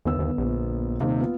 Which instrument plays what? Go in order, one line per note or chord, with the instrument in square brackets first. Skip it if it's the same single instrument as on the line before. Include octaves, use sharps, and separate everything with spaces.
[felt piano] G1 B3 E6 [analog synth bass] D#2
[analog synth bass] D#2
A#1
[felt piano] D#1 D#4 F5 [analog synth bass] C3
[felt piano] B3 F4